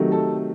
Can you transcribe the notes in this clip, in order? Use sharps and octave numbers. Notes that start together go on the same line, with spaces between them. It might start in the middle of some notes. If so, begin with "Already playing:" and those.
Already playing: C3 D#3 F#3 A3
A4